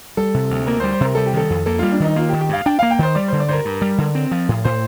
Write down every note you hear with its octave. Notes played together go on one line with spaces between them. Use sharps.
G3 A4
C3
D2
A#3 A#4
C5
G3
C5
C3 A#4
G3 A4
G4
D#3 A4
F2
A#3 A4
G3 F4
D4
D#3 D#4
A#3 F4
G4
D#3
G4
G2 F5
D4 G5
A#3 F5
G5
D#3 C5
G3 D5
D3 C5
D5
G2 A#4 C5
G2
G3
D3
C4
F3
A2
A2 C5